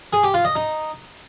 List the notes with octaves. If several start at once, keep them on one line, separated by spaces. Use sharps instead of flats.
G#4
G4
F4
D#5
D#4